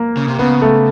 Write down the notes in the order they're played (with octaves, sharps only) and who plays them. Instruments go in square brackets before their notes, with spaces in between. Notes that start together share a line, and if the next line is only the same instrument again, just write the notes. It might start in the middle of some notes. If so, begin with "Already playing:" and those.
Already playing: [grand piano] A#3
[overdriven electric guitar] C#3
C3
[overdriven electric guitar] C#3 [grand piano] B3
[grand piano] A3